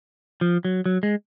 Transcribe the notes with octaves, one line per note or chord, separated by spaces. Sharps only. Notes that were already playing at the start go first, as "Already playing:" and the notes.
F3
F#3
F#3
G#3